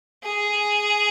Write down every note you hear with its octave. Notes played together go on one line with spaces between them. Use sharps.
G#4